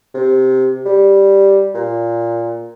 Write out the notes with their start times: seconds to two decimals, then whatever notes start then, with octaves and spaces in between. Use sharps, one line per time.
0.14 C3
0.86 G3
1.74 A#2